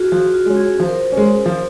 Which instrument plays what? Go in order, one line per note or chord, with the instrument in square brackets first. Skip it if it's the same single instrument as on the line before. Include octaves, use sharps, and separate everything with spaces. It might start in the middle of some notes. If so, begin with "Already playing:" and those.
Already playing: [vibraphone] F4 F#4 G#4
[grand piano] F3 [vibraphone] F#4
[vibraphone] F4
[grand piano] G#3 C#4
[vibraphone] G#4
[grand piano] F3 [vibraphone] C5
[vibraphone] A#4
C5
[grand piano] C#4
G#3
F3